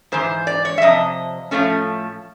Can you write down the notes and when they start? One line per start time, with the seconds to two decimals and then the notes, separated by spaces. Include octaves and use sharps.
0.12 G#2 E3 C5
0.47 D5
0.65 C#5
0.78 E5
0.82 C3 F3 D#5
1.51 A2 F3 A3 C#4